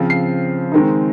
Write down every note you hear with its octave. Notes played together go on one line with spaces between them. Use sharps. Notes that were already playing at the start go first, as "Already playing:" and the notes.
Already playing: C#3 F3 C4
C7
D#3 G#3 C4 D#4